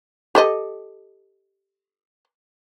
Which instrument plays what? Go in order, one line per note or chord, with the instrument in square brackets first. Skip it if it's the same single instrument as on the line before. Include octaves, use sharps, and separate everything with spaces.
[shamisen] G4 A4 D#5